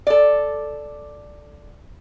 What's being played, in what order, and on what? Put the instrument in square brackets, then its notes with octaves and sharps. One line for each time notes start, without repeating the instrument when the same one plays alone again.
[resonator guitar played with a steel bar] A4 D5